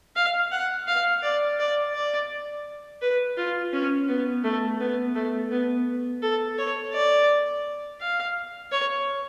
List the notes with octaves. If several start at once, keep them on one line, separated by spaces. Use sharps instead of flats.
F5
F#5
F5
D5
D5
D5
B4
F4
C#4
B3
A3
B3
A3
B3
A4
C#5
D5
F5
C#5